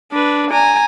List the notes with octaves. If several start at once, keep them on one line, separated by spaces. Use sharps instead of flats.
D4 B4
G#5 A#5